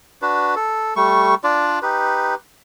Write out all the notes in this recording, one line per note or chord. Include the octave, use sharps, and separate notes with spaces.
D4 F#4 B4
A4
G3 A3 C#6
D4 F4 D5
D#4 G4 B4